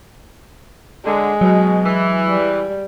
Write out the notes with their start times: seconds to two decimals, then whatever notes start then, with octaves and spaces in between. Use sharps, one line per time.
1.05 D3 G#3
1.41 B2 F#3
1.85 E3
2.29 G3